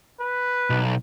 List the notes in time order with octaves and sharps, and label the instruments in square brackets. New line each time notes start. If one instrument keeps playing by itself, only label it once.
[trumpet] B4
[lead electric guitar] B1